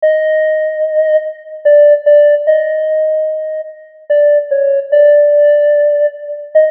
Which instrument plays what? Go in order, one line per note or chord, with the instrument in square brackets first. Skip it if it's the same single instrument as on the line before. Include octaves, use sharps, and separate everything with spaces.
[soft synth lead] D#5
D5
D5
D#5
D5
C#5
D5
D#5